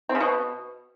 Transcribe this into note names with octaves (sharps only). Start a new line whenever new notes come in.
C4
C#3
B2